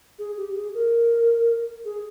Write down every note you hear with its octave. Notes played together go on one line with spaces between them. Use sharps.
G#4
G4
G#4
A#4
G#4